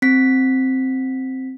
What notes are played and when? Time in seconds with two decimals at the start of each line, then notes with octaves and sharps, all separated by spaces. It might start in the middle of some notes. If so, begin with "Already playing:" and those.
0.02 C4 B6